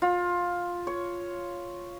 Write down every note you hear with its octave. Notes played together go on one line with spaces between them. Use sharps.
F4
C#5